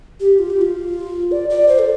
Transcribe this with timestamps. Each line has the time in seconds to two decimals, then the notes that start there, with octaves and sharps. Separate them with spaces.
0.20 G4
0.39 F4
0.50 G4
0.61 F4
1.31 D5
1.50 D5
1.68 C5
1.79 A4